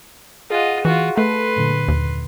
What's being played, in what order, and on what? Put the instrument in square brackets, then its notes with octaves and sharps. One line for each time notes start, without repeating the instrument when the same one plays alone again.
[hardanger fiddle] F4 D#5 [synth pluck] G#4 F#5
[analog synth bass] E3 [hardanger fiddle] F4 F#4
[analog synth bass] A3 [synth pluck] A4 [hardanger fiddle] B4 C6
[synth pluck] F#2 A#2 D3
[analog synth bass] D#2